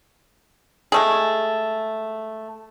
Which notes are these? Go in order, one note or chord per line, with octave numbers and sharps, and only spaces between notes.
G#3 A3 G#4